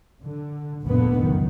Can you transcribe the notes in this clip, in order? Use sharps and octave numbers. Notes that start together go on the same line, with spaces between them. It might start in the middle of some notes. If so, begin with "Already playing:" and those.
D3
F1 D2 A#2 D3 B3
C#2 F#2 D#3